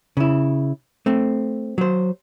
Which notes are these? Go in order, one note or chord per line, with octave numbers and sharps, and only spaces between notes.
C#3 E4
A3 C4
F#3 C5